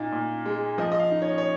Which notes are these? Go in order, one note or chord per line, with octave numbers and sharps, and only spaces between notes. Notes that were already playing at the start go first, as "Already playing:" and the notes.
Already playing: A#2 D#4
A#2
G#3
F3 D#5
D#5
F5
D#4
C#5
C#5